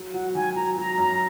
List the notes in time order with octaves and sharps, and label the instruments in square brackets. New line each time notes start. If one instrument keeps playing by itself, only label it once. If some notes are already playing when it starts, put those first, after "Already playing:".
Already playing: [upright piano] F#3
[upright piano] F#3 [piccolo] F#5
[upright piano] D#3 [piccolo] G#5
[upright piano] F#3 [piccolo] A#5
[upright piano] F#3 [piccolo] A#5
[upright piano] F#2 [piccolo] A#5